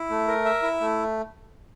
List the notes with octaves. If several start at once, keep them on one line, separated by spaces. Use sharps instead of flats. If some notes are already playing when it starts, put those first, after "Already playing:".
Already playing: E4
A3
A#4
E5
E4
A3